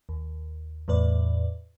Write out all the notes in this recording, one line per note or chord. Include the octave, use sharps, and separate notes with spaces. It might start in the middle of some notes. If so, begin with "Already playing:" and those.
D#2
E2 A2 B4 D5